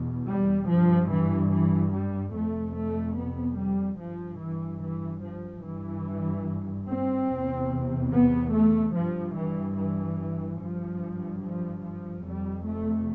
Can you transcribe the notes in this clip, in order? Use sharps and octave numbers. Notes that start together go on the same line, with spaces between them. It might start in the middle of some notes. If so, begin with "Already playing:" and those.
Already playing: E2 B2
G3
G2 F3
E3
E3
G3
F2 C3 A3
A3
B3
G3
G2 F3
E3
E3
F3
G2 E3
C4
E2 C3
B3
A3
G2 F3
E3
E3
G2 F3
F3
F3
F2 C3 G3
A3